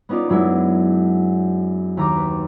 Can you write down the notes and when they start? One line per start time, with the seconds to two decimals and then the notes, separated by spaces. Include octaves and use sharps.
0.09 B3 C#4 D#4 F4 D5
0.29 F#2 F#3 G#3 B3 D4 E4
1.97 D#2 A#5 D6
2.16 B4